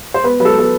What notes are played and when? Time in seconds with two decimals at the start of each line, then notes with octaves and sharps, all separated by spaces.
0.14 C5
0.24 B3 B4
0.40 F#3 B4
0.45 A4
0.56 B3 A4